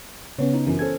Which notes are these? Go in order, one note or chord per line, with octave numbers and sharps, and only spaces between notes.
C#3 B3 C#4 C#5
D#4
F#2 E3
C#4 A4 C5 G#6